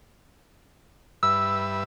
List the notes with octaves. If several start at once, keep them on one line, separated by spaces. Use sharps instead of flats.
G2 B4 E5 E6